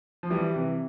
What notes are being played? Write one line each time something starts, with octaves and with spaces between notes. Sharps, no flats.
F3
E3 G3
C3 E3